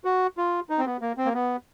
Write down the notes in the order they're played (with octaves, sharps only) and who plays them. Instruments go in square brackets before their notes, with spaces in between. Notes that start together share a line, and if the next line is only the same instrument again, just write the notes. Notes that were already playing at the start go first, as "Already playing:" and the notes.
[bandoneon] F#4
F4
D#4
C4
B3
A#3
C4
A#3
B3